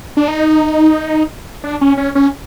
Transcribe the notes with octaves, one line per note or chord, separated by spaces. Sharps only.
D4
D#4
D4
C#4
C#4
C#4